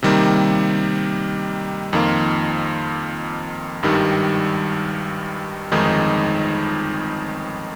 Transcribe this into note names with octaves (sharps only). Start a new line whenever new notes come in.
C3 D#3 G3 A#3
F2 D#3 A#3 F4
G#1 G2 D#3 G3
G1 F2 D#3 G#3 D#4